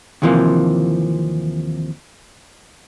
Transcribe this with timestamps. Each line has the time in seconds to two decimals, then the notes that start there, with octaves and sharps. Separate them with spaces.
0.22 D#2 C3 E3 F3 A#3